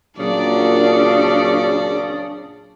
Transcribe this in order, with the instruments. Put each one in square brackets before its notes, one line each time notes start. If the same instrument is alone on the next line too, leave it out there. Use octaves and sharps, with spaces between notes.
[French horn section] A#2 F#3 [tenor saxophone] C#3 [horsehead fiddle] D4 [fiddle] D5